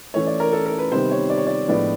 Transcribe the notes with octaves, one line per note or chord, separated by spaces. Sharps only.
E3 A3 C#4 C#5
D5
A#4
A4
A#4
B4
C3 D#3 G3 B3 C5
C#5
D5
C#5
D5
A2 F3 G#3 B3 D4 D5